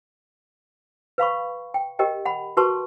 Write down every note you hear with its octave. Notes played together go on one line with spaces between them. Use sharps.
B4 F5 B5 C#6
G5
G4 A#4 D#5 G5
F#5 B5
F#4 A#4 B4 A5 C6 C#6